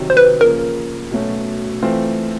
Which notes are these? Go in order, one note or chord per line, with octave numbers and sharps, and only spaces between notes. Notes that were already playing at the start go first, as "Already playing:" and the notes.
Already playing: C3 D#3 F#3
C5
B4
C#3 F3 A#3 A#4
B2 F#3 A3 C#4
E3 A3 C4 F4